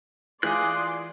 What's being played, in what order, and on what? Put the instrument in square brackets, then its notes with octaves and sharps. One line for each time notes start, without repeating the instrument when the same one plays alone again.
[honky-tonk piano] E3 [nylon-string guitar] F4 G#4 G#5 [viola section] D5 C6 [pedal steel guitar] D#6 F#6